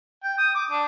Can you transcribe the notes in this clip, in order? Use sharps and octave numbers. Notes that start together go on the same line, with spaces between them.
G5
D#6
D6
D4